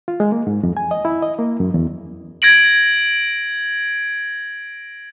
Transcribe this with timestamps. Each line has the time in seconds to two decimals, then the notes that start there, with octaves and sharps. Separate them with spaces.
0.08 F4
0.20 G#3
0.32 A#3
0.47 G#2
0.63 F2
0.77 G#5
0.91 D#5
1.05 E4
1.22 D#5
1.39 A#3
1.60 F#2
1.74 E2
2.42 G#6 A#6 D7 F#7